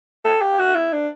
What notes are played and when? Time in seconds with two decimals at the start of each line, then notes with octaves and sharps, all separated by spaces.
0.25 A4
0.41 G4
0.59 F#4
0.75 E4
0.93 D4